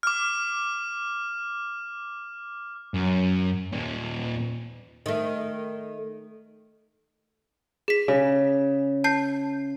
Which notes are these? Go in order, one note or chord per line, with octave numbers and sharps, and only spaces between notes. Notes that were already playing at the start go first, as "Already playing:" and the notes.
D6 F6
F#2
D#2 A#2
D#3 A3
G#4 B6
C#3
A5 G6 C7